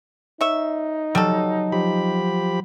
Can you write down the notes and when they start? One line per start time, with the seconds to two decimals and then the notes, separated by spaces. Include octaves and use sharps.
0.41 D#4 C#5 E5
1.15 F#3 G3 A4
1.72 F3 G4 B5